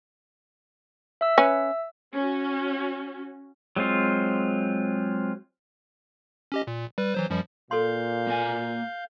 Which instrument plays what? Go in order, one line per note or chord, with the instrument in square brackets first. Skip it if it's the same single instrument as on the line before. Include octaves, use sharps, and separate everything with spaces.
[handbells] E5 E6
[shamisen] C#4 B4
[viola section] C#4 F#4
[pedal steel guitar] F#3 G#3 C4 F4
[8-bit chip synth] C#4 G4 D#5
A#2
G3 B4
E3 F#3 C5
F#2 F3 G3
[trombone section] A#2 [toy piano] A4 C6 [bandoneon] F5 G6
[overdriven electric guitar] A#3 G#5